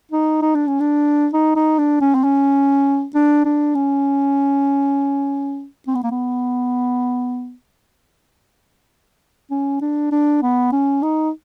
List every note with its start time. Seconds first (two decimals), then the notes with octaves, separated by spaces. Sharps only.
0.11 D#4
0.42 D#4
0.55 D4
0.67 C#4
0.80 D4
1.33 D#4
1.56 D#4
1.78 D4
2.01 C#4
2.15 C4
2.24 C#4
3.15 D4
3.45 D4
3.75 C#4
5.88 C4
5.95 B3
6.03 A#3
6.11 B3
9.51 C#4
9.81 D4
10.11 D4
10.42 B3
10.72 C#4
11.03 D#4